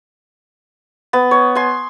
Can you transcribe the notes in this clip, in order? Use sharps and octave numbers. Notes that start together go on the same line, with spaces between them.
B3
C#5
G#5 C6